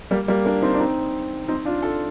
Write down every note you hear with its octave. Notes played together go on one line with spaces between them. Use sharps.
G3 A#3
G3 A#3
A#3 D4
C4 D#4
D4
C4 D#4
C4 D#4
D4 F4
F4 A4